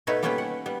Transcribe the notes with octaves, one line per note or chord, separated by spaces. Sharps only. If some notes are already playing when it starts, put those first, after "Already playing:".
B2 A3 B3 D#4 B4 C#5
G3 A#3 B3 C#4 B4 G5
F#5
G3 B3